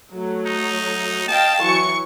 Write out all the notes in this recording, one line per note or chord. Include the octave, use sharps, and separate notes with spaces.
F#3 A3
D#4
D#5 F5 G5 A5
E3 F#3 C#6 C#7